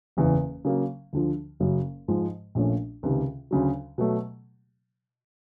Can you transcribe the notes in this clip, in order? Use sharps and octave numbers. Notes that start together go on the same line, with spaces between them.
F#1 E2 C#3 E3
C#3 F#3 A#3
D2 D3 F3
F#1 F#2 C#3 F#3
G#2 F3 G#3
A#1 A#2 F3 A3 C#4
C#2 C3 D#3
D2 C#3 F#3
B2 F#3 A3